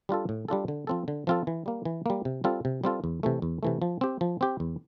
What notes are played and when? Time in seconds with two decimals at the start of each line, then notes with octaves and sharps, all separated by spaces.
0.09 G3 D4 F4 A4
0.29 A2
0.48 G3 D4 F4 A4
0.68 D3
0.87 F3 C4 F4 A4
1.08 D3
1.27 F3 C4 F4 A4
1.47 E3
1.66 G3 A#3
1.85 E3
2.06 G3 A#3
2.25 C3
2.44 G3 C4 F4 A4
2.65 C3
2.84 G3 C4 F4 A4
3.04 E2
3.23 C3 E3 A3
3.42 E2
3.63 C3 E3 A3
3.82 F3
4.01 C4 G4
4.21 F3
4.41 C4 G4
4.60 E2